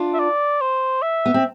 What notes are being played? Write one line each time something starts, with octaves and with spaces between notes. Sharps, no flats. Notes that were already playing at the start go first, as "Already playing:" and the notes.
Already playing: D4 F4
E5
D5
C5
E5
B3
C4